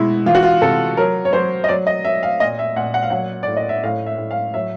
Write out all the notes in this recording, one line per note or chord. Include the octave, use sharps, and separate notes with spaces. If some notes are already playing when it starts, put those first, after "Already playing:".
Already playing: B2 G#3 E4
E3 F4
F#4
F4
C3 A4
F#3 A#4
C#5
F#3 C5
D#5
F#3 D5
D#5
F#3 E5
F5
A#2 D#5
E5
A#2 F#5
F#5
F5
F#3 F#5
D5
A2
D#5
E5
A2 F5
E5
A2
F5
F#3 E5